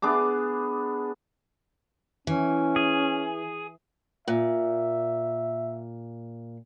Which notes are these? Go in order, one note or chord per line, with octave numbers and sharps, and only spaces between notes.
B3 D4 G#4 D6
E3 C#4
G#4
A#2 E5